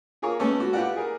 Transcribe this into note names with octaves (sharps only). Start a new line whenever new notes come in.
F4 G#4 A#4 C#5
G#3 A3 B3 C#4 A4
F#4
E4 F4 G4 B4 D5 F#5
G#4 A#4